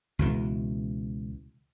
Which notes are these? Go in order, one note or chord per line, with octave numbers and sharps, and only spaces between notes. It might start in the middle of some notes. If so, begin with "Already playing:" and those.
C#2 B2 E3